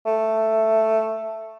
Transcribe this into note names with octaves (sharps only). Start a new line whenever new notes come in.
A3